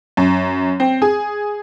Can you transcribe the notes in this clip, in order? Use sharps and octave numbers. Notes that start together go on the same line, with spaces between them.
F#2
C4
G#4